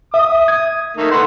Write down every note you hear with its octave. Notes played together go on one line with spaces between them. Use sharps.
E5 D#6
G#6
D#3 A3 A#3
A4 B4 F#5 C6